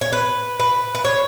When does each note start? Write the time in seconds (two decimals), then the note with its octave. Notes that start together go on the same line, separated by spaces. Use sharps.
0.01 C#5
0.12 B4
0.60 B4
0.95 B4
1.05 C#5